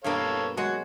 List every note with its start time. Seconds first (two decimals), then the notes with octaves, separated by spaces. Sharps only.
0.04 G2 B2 A#3 A4 C#5 F5
0.57 F#3 G#3 F#4 C#5